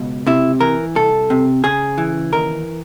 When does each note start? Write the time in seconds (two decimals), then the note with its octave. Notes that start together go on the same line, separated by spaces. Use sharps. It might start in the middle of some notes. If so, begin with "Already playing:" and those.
Already playing: C#2 B2
0.26 C3 E4
0.60 E3 A#4
0.95 C2 A4
1.30 C3
1.64 C#3 G#4
1.98 E3
2.32 D#2 A#4